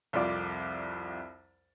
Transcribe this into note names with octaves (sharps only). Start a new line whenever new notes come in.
C2 F2 F4 D5 D6